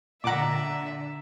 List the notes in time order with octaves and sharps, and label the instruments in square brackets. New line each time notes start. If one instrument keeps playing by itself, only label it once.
[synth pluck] A#2 F#5 [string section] D3 [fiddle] E5 [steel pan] A#5 D6